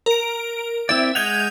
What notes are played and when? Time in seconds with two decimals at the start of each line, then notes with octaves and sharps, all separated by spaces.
0.06 A#4 D7
0.89 C4 E4 D5 E5
1.15 G#3 D#5 F#5 G6 G#6 F7